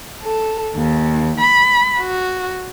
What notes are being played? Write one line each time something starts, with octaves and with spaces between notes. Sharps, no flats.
A4
D#2
B5
F#4